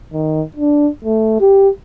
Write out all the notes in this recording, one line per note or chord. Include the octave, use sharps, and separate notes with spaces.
D#3
D4
A3
G4